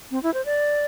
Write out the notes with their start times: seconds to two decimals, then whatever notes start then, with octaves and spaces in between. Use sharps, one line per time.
0.11 C4
0.23 E4
0.34 C5
0.46 D5